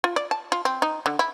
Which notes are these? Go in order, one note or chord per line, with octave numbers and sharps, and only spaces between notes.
F4
D5
A5
F4
C4
D#4
D3
E4